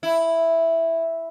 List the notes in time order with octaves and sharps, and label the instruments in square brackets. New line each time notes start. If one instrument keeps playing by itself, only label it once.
[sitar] E4